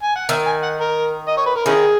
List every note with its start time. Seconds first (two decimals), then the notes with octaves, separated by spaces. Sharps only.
0.03 G#5
0.16 F#5
0.29 D#3 E5
0.46 G#5
0.63 F#5
0.80 A#4
1.28 D#5
1.38 C#5
1.46 B4
1.56 A#4
1.66 D#3 C#4 E4 G#4